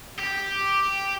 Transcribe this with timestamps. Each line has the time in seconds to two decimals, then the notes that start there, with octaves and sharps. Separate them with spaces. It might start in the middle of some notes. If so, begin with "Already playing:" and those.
0.19 G4